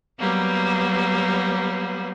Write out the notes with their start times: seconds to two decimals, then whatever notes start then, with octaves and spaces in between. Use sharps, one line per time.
0.19 F#3 G3 A#3 B3